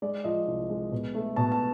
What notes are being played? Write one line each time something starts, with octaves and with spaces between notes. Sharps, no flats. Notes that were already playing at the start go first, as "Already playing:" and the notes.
G#3 D5
F3 D#5
C2
G#3
B2
A3
B2 A5
A5